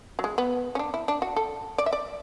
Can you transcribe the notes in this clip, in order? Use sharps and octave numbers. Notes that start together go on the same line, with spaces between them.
F#3
G#3
B3
C#4
D4
E4
D4
F#4
A4
D5
E5
D5